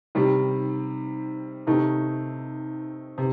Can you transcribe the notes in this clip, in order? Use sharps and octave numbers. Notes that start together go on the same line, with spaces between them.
C3 D#3 G3
C3 D#3 A3 D#4
C3